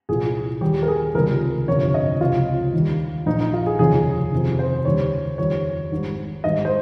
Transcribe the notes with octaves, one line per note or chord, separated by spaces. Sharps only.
C2 A#2 F3 G#4
D#2 D#3 G3 G4
A#4
G#4
C#2 C3 D#3 G3 A#4
G1 F2 C3 F3 C#5
D#5
C#2 C3 F3 F4
D#2 D#3 G3
A#1 A#2 F3 D#4
D#4
F4
G#4
F1 D#2 C#3 F3 G#4
F2 C3 D#3
C5
D#2 C#3 G3 C#5
F2 D#3 G3 C#5
G#1 G#2 G3
G#1 G#2 G3 D#5
C5